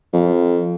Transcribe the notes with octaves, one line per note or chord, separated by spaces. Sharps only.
F2